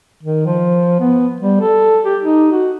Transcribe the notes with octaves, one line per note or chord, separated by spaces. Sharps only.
D#3
F3
B3
G3
A4
G4
D#4
F#4